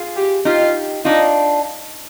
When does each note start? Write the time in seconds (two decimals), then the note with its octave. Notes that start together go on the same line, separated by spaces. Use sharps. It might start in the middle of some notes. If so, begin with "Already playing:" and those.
Already playing: F4 G#4
0.16 G4
0.45 D#4 F4 G4
1.05 D4 D#4 F4